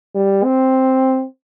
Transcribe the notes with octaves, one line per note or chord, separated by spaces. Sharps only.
G3
C4